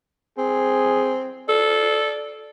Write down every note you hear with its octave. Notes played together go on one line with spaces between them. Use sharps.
C4 G#4
A4 D5